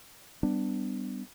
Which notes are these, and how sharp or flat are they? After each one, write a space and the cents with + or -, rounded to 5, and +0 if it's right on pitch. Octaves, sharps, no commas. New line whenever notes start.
G3 +0 B3 +25 D4 +10